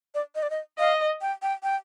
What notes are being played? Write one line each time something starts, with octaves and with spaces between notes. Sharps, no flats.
D5
D#5
D5
D#5
D#5 F5
G5
G5
G5